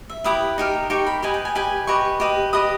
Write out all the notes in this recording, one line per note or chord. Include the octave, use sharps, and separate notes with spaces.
E5
E4 G4 B4 D#6
D#4 G4 A#4
D#4 G4 A#4 C#6
B5
G4 B4 D#5 G#5
G5
G#5
G4 B4 D#5 G#5
G4 B4 D#5 C#6
G4 B4 D#5
G4 B4 D#5 D#6